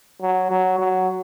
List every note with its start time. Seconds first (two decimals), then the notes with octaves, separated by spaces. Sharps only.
0.22 F#3
0.50 F#3
0.79 F#3